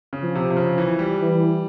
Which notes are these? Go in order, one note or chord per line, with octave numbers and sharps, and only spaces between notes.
C#3
F3
C3
C3
C#3
E3
G3
E3